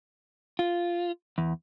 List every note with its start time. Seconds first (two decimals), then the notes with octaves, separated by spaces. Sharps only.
0.59 F4
1.38 E2